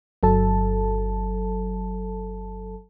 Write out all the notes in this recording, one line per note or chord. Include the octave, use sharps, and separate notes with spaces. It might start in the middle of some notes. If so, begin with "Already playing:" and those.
G1 F#3 A4 A5